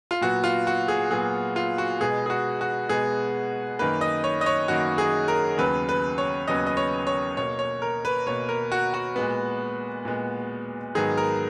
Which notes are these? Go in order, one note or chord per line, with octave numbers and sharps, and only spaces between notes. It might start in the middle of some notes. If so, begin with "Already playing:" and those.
F4
A#2 F#3 B3 F#4
F4
F#4
G#4
A#2 F#3 B3 G#4
F4
F#4
B2 G#3 B3 G#4
G#4
F#4
F#4
B2 G#3 B3 G#4
F#2 D#3 A#3 B4
D#5
C#5
D#5
C#5
F#2 D#3 A#3 F#4
G#4
A#4
D#2 C#3 F#3 B3 B4
B4
C#5
D#2 C#3 F#3 B3 D#5
D#5
C#5
C#5
B2 A#3 C#5
C#5
A#4
B4
B2 A#3 C#5
A#4
F#4
F#4
A#2 G#3 B3
A#2 G#3 B3
G#2 D#3 F#3 B3 G#4
A#4